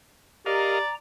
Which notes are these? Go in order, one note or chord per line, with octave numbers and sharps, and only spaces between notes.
G4 A#4 D5 D#5 F5 A#5